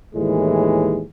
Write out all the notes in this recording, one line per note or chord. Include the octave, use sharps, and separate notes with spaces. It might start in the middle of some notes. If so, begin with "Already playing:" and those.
D#2 A2 E3 G#3